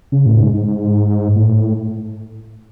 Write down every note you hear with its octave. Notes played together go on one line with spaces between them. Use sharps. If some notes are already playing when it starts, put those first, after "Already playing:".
C#3
A2
G#2
G#2
A2